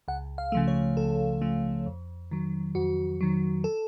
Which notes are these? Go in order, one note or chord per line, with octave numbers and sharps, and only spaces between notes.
C#2 F#5
F5
C#3 F3 A3
C#5
C#2 A4
C#3 F3 A3
F2
D#3 F#3
F2 F#4
D#3 F#3
A4